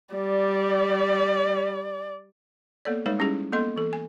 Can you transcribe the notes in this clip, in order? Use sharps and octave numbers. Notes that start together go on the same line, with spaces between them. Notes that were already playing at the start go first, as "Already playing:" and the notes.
G3 D5
A#3 B3 A4 C#5 D5
G3 G#3 D#4 B4 C#5 E5
G3 C#4 E4 G4 G#4
A#3 B3 A4 D#5 C6
E3 A4
G#5